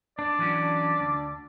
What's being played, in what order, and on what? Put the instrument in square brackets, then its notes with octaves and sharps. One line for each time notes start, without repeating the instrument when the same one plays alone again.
[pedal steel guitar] D4 [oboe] D5
[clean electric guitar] E3 F#3 C#4
D2